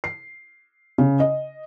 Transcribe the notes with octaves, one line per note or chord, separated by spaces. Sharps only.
C7
C#3
D#5